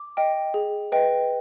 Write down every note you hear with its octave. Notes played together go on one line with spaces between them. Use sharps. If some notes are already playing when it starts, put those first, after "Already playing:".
Already playing: D6
D#5 G5
G#4
B4 D#5 G5